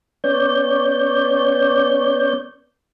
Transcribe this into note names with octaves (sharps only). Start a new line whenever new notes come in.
B3 C#4 C#5 D5 G6